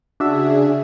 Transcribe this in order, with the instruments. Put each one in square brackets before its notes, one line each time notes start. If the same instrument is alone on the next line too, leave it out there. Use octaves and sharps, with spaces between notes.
[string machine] C#3 G#4 [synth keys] D4 F#4 E5